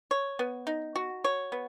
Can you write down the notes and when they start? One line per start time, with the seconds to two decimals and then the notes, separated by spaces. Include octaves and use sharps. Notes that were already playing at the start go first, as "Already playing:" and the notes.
0.11 C#5
0.39 B3
0.67 D#4
0.96 F#4
1.24 C#5
1.52 B3